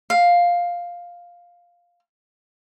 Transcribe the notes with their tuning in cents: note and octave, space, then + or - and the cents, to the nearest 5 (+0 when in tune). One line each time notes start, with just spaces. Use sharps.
F5 +5